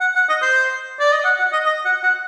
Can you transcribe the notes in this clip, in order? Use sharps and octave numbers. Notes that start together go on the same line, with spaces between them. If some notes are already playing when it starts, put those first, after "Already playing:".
F#5
F#5
D#5
C5
D5
D#5
F#5
F#5
D#5
D#5
F#5
F#5